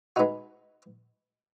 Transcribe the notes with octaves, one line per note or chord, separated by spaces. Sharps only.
G#3 B3 D#4 F#4